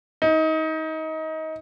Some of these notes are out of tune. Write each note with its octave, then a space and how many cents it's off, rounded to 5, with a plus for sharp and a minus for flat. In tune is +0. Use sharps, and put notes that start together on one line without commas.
D#4 +25